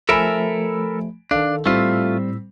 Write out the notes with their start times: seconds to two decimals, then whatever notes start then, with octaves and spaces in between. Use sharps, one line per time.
0.09 F3 A3 A4 A#4 E5 G#5 B5 D7
1.31 D#3 D4 A4 F5
1.66 A2 G3 A3 C4 F4 E6 B6